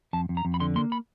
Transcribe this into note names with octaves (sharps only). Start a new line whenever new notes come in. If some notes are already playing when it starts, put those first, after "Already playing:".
F2 A5
F2
A#5
F2
B5
D3 C6
A#3 C6
B5